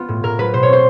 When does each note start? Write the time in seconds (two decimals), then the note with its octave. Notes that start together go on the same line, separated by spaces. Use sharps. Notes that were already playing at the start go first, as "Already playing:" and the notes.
Already playing: B3 F4
0.08 A2
0.23 A2 A#4
0.38 F#3 B4
0.53 B2 C5
0.63 C#5
0.68 C4 C5